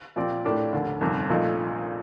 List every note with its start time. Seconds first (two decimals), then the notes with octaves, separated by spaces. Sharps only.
0.16 A#2 F3 C4 G4 D5
0.44 A2 A3 D4 G4 A#4
0.73 F1 D#2 D3
1.01 G1 F2 C3 D#3 G3
1.30 A#1 A#2 F3 A3 D#4